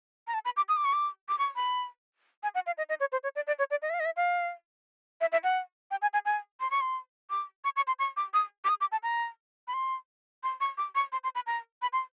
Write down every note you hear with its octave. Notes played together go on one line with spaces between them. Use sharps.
A#5
A5
B5
D6
D#6
D6
C#6
D6
D6
C#6
B5
G#5
F#5
F5
D#5
D#5
C#5
C5
C#5
D5
D5
C#5
D5
D#5
E5
F5
D#5
E5
F5
E5
E5
F#5
G5
G#5
G#5
G#5
C6
C#6
C6
D6
C#6
C#6
C6
C#6
D6
D#6
D6
D#6
D6
A5
A#5
B5
C6
C6
C#6
D6
C#6
C6
C6
B5
A#5
B5
C6